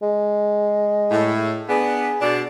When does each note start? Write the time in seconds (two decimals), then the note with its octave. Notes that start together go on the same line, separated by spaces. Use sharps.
0.02 G#3
1.11 A2
1.69 B3 D4 G#4
2.21 B2 D4